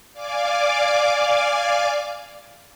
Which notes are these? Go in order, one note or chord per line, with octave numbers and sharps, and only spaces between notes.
D5 F5 G#5 D6